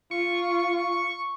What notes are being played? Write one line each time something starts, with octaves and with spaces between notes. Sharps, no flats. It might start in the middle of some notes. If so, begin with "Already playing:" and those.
F4 C#6